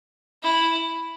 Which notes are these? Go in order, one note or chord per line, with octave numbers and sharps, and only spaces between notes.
E4